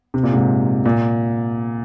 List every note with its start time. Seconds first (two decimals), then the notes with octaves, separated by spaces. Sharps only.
0.14 C3
0.23 A#2
0.33 G#2 C3
0.85 A#2